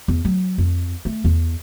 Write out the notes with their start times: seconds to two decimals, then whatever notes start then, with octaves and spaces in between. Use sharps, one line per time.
0.08 E2
0.25 F#3
0.58 F2
1.05 A3
1.24 E2